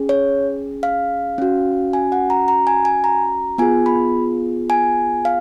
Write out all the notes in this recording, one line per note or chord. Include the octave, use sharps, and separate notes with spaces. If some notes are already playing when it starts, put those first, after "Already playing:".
Already playing: C#4 G#4
C#5
F5
C#4 F#4
G#5
F#5
A#5
A#5
G#5
G#5
A#5
B3 F4 G#4 G#5
B5
G#5
F5